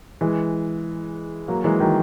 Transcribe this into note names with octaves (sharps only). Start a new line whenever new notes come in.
E3 G#3
F#3 A#3
E3 G#3
D#3 F#3